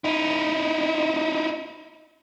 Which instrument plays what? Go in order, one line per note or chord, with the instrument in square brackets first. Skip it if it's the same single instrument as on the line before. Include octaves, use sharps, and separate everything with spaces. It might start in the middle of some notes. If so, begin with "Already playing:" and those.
[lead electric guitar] D#4 E4